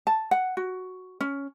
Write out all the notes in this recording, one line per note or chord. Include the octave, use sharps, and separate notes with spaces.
A5
F#5
F#4
C#4